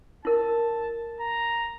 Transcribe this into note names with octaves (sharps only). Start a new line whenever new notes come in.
E4 A#4 A5
A#5